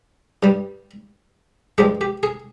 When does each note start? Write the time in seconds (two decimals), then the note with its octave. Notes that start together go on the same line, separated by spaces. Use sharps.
0.43 G2 G3
1.78 G2 F3 G#3 G4
2.01 G4
2.23 G#4